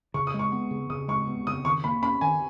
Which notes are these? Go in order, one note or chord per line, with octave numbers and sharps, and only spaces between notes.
C#3 C#6
D#6
G#3
C#6
B3
C#3
C#3 D#6
G#3 C#6
B3
C#3 D#6
D#3 C#6
A#3 B5
C#4 B5
D#3 G#5